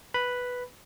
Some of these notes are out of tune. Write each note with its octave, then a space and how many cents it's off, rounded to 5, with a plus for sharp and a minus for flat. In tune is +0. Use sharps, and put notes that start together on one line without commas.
B4 +0 B5 +0